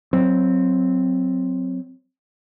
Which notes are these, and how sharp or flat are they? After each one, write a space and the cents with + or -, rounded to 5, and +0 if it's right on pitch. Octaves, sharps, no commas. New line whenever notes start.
F#3 +0 C4 +0